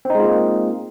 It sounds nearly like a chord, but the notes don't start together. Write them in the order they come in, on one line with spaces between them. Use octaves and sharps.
C4 D#4 G#3 F4 A#3